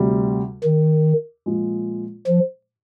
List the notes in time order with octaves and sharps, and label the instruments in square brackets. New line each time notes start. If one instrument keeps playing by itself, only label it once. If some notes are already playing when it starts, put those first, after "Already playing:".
Already playing: [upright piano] D2 C3 G3
[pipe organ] D#3
[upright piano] A#2 F3 G#3
[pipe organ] F3